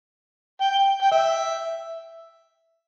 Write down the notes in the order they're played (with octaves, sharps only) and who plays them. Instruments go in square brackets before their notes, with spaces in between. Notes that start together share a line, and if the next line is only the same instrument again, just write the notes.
[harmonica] G5
G5
E5